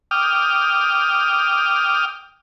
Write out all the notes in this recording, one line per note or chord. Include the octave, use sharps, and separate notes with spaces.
G5 D6 D#6 F6